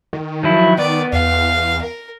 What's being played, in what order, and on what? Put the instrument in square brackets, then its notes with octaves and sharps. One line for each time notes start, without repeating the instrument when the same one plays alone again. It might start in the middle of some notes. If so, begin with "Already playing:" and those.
[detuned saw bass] D#3
[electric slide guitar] F3 F#3 E4
[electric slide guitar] B3 [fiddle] D5
[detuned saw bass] E2 [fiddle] F5
[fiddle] A#4